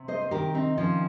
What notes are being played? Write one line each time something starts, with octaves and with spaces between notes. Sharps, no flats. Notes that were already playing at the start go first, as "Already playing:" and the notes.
Already playing: C3
C5 D#5
C5
D#3 G4 A#4
C4 D#4
F3 C#4 F4